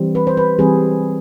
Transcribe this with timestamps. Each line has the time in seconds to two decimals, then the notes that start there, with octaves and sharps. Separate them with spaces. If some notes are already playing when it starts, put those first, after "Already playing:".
Already playing: E3 G3 C4
0.15 B4
0.27 C5
0.37 B4
0.59 E3 G3 C4 G#4